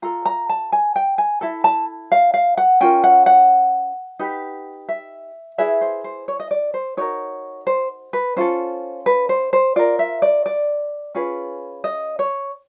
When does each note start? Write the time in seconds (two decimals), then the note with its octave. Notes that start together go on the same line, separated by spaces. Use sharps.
0.02 F4 A4 A#5
0.26 A#5
0.49 A5
0.72 G#5
0.96 G5
1.18 G#5
1.41 E4 A4 A5
1.64 A5
2.12 F5
2.34 F5
2.57 F#5
2.81 C#4 F4 A#4 G5
3.04 F#5
3.26 F#5
4.19 D#4 G4 B4
4.89 E5
5.58 E4 G#4 B4 E5
5.81 C5
6.04 C5
6.28 C#5
6.40 D#5
6.51 D5
6.74 C5
6.97 D#4 F#4 A#4 C#5
7.67 C5
8.13 B4
8.36 C#4 F4 A4 C5
9.06 B4
9.29 C5
9.53 C5
9.76 F4 A#4 D5
9.99 E5
10.22 D5
10.46 D5
11.15 C#4 F4 G#4 B4
11.84 D#5
12.19 C#5